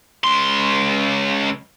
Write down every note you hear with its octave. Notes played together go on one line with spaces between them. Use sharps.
C#2 C6